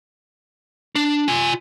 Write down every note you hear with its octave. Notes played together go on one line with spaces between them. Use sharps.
D4
F4 G#5